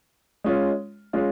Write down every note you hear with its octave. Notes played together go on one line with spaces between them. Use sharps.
G#3 C#4 F4
G#3 C#4 F4